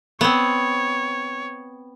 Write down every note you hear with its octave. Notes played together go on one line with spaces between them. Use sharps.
B3 C4 C#5